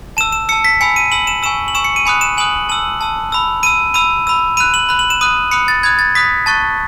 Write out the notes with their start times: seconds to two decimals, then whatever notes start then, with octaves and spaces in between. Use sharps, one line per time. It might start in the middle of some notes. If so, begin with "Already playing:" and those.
0.17 A5 E6 E7
0.32 E7
0.49 A5 E6 C#7
0.65 B6
0.81 G#5 B5 E6 C#7
0.96 D#7
1.11 G#5 B5 E6 F#7
1.27 E7
1.43 G#5 C#6 E6 E7
1.68 F#7
1.75 G#5 C#6 E6 E7
1.84 C#7
1.96 D#7
2.05 G#5 B5 D#6 F#6 C#7
2.21 E7
2.37 G#5 B5 D#6 F#6 F#7
2.69 A5 E6 F#7
3.01 A5 E6
3.32 B5 E6
3.63 B5 E6 D#7
3.94 B5 E6 D#7
4.27 B5 E6
4.57 B5 F#6 D#7
4.74 F#7
4.89 B5 F#6
4.99 F#7
5.10 E7
5.21 B5 D#6 F#6 D#7
5.51 B5 D#6 F#6 C#7
5.68 A6
5.83 B5 D#6 F#6 G#6
5.99 A6
6.15 B5 D#6 F#6 B6
6.46 A5 C#6 F#6 A6